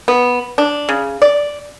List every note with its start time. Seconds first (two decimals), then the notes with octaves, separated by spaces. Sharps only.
0.08 B3
0.58 D4
0.89 C#3
1.22 D5